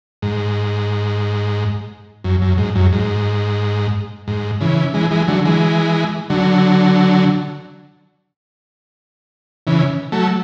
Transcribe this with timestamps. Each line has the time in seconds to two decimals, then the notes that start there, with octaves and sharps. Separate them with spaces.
0.22 G#2
2.24 F#2
2.42 F#2
2.58 G#2
2.75 F#2
2.93 G#2
4.28 G#2
4.61 C#3 E3
4.94 E3 G#3
5.11 E3 G#3
5.28 D3 F#3
5.45 E3 G#3
6.30 D3 F#3
9.67 C#3 E3
10.12 F#3 A3